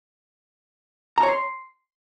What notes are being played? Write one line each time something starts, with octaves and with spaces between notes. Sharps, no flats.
A#5
C#5
C6